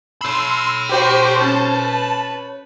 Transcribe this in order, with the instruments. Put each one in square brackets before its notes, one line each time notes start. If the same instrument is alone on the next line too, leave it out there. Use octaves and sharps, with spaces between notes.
[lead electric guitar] C#5 B5 [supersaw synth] C6 E6
[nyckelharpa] F#4 C#6 [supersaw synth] G4 C5 G5
[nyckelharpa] C#4 C5 [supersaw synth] A5
[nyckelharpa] B4